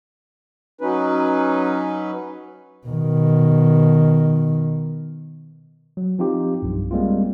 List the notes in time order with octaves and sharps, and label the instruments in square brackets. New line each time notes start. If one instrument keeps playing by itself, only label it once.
[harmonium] F#3 C#4 D#4 B4
[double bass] B2 D#3
[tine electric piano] F#3
F3 C4 D#4 F4 G4
B1 G2
G3 G#3 A#3 C4 F4